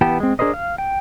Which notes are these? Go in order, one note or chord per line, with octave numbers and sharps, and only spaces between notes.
E3 B3 G4 G5 A5
G#3 C4
D4 G#4 A#4 C5 D#5
F5
G5